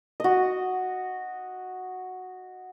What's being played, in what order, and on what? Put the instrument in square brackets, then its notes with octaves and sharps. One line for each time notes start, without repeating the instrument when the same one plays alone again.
[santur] F#4 D#5